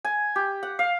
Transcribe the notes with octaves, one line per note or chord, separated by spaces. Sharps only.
G#5
G4
F#5
F5